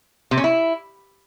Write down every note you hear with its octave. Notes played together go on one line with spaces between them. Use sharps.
C3
C#4
E4